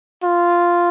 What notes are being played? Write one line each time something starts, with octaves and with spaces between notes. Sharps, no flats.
F4